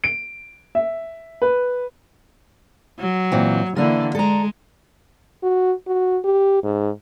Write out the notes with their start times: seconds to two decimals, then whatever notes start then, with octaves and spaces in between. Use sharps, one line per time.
0.04 D7
0.75 E5
1.42 B4
3.00 F#3
3.32 A#2 E3 C4
3.76 D3 E3 A#3 D4
4.15 G#3 A4 A#5
5.43 F#4
5.87 F#4
6.25 G4
6.64 G#2